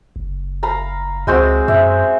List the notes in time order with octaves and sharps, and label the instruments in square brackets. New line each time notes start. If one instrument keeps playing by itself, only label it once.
[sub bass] F#1
[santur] F5 A#5 B5
[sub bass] C#2 [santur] G#3 C4 F#4
[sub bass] F#2 [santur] E5